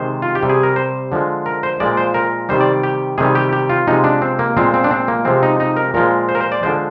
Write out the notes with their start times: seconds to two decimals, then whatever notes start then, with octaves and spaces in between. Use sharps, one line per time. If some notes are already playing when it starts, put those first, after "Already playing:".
Already playing: C3 D#3 G#3 C5
0.22 F4
0.35 G4
0.43 C3 G3
0.49 G#4
0.63 A#4
0.76 C5
1.12 D3 F3 G#3
1.46 A#4
1.63 C5
1.80 A#2 F3 G#3 D5
1.97 C5
2.14 A#4
2.49 C3 D#3 G3 C5
2.61 D5
2.83 G4
3.18 C3 D#3 G3 G#4
3.35 G4
3.53 G4
3.69 F4
3.87 C3 F3 G#3 D#4
4.04 D4
4.22 C4
4.39 A#3
4.57 A#2 F3 G#3 C4
4.74 C4
4.84 D4
4.91 C4
5.08 A#3
5.25 C3 F3 G#3 C4
5.43 D#4
5.60 D#4
5.77 A#4
5.94 A#2 F3 G#3 A#4
6.29 C5
6.35 A#4
6.41 C5
6.52 D5
6.63 D3 F3 G#3 C5